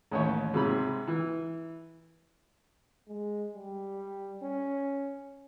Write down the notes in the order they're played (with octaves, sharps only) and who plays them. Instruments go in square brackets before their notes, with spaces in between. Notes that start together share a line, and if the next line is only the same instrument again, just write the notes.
[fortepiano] A1 D#2 C#4 C#5
G#2 C3 B5
E3
[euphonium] G#3
G3
C#4